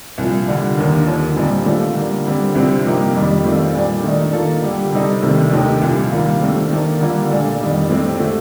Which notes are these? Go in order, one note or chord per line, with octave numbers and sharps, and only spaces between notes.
C2 A#2 F3
D3 G3 D4
D#2 D#3 A#3
D#2 D3 F3
A#2 G3 C4 D#4
D#2 D3 A3 D4 F4
D3 G3 A#3
D3 G3 C4
C2 C3 F3 C4
G2 F3 A#3 D#4 G4
F2 D#3 G3
D#3 A3 C4 F4
A#2 G3 D4
D#3 A3 D#4
D#3 A#3 F4 A4
D3 G3 D4 G4
C3 G3 C4 D#4 A4
C2 C3 D#3 A3
D#2 D#3 A3 D#4 G4
C2 A#2 F3
D#3 G3 A#3 F4
D#3 A3 C4
D#3 A#3 D4 A4
D3 G3 A#3 F4
A#2 A3 D4 F4 A4
F2 D#3 G3
A2 A3 C4 G4
D3 A3